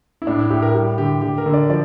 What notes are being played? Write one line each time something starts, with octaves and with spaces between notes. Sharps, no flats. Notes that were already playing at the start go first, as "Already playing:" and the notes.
E4
A2 D4
E4
A2 G4
A#4
G3 G4
D3 G4
D3 G4
A#4
D3
D5
F3 D5